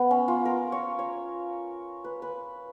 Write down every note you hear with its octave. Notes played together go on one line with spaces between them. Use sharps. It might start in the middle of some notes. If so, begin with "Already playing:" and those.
Already playing: B3
C#4
F4
A#4
C#5
C#5
B4
B4